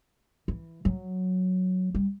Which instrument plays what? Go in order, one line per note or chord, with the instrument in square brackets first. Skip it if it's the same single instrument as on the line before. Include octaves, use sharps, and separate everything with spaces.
[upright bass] E3
F#3
G3